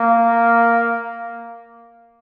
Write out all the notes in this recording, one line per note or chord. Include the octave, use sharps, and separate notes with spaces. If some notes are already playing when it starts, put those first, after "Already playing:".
Already playing: A#3